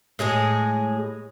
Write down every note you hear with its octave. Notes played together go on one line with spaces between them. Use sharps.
A2 G#3 G#4 A#5